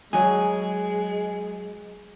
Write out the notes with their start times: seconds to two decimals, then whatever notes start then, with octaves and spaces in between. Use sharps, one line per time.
0.13 F#3 G#3 G#4